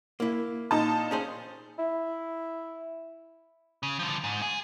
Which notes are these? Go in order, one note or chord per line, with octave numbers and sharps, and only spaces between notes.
A#3 E4
A#2 D#4 A5
C#4 G#4 C5
E4
C#3
D3 F3
G#2
G#4